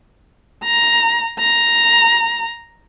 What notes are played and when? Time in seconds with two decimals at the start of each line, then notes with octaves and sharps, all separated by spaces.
0.64 A#5
1.39 A#5